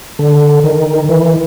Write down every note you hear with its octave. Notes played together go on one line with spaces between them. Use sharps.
D3
D#3
E3